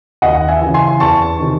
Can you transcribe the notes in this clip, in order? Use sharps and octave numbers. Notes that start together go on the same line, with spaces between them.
D#2 D#5 F#5
E5 G#5
C#3 E3
G#5 C6
E2 A5 C#6
C3 D#3